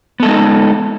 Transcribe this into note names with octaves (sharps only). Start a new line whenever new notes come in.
G#3 B3 D#4 A4